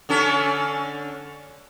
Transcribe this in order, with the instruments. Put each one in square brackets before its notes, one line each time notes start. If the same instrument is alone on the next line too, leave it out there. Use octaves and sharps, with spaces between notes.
[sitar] D3 C#4 A4